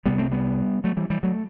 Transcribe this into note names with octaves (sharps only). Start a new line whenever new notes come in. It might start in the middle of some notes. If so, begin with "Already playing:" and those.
C2 C3 G3 B3
A3 C4
G3 B3
F#3 A3
E3 G3
E3 G3
F#3 A3